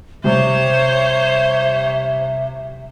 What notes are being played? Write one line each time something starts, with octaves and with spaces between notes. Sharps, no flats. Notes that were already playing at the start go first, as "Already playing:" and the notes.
C3 G3 C5 C#5 E5